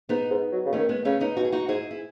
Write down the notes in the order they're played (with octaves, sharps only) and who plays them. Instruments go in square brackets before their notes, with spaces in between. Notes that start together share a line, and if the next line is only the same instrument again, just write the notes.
[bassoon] G#2 [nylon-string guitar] B3 D#4
[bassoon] G#2
F#3
C#3
[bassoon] D#3 [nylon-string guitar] A3 C#4
[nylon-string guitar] G#3 B3
[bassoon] C#3 [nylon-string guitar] A3 C#4
[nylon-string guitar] B3 D#4
[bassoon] B2 [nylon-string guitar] F#4
[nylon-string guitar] G#4
D#4 F#4
[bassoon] G#2 [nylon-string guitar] E4 G#4
[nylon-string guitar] E4